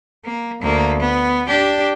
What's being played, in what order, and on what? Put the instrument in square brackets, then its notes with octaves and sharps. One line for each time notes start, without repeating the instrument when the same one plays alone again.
[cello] A#3
D2 A#3
B3
D4 G4